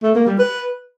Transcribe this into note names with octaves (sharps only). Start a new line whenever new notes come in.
A3
A#3
G3
B4